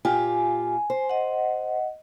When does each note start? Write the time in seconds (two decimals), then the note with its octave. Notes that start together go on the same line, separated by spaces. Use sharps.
0.05 A#2 F4 G4 G#5
0.90 C5
1.09 D#5 F#5